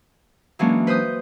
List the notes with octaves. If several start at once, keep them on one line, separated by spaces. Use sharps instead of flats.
E3 F#3 G#3 A#3 C#4 D4
B4 C5 C6 D#6 G6